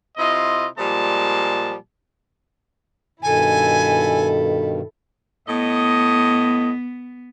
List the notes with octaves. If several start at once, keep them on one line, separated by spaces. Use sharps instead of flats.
C3 E4 F4 D#5
A#2 F3 G3 G#3 A5
G2 B2 D#3 E4 A4 G#5
A2 B3 D#5